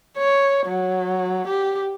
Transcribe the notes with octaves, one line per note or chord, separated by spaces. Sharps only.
C#5
F#3
G4